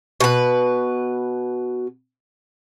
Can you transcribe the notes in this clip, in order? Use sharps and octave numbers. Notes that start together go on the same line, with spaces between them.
B2 B4